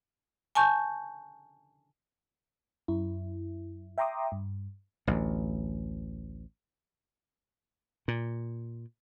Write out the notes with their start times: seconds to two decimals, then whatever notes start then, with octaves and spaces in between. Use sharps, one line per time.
0.55 G#5 A5 C#6 G6
2.88 F#2 E4
3.98 E5 G5 A#5 C6 D6 D#6
4.32 G2
5.07 A1 D2
8.08 A#2